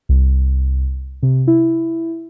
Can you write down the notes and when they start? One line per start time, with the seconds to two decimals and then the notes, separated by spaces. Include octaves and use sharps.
0.09 C2
1.23 C3
1.47 E4